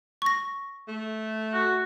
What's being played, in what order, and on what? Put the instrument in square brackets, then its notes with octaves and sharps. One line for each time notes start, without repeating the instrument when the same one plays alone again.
[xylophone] C#6 A#6
[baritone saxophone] A3
[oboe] F#4